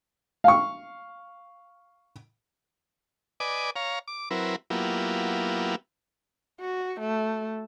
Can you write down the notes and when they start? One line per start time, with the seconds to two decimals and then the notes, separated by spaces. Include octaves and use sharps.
0.44 F5 C#6
3.40 B4 D5 D#5 G#5 D6
3.76 C#5 F5 A#5
4.08 D6
4.31 F#3 C4 E4 A#4 B4
4.70 F#3 A#3 B3 E4 F4 G4
6.61 F#4
7.00 A3